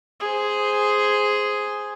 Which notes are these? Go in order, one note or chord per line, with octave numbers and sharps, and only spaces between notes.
G#4 C5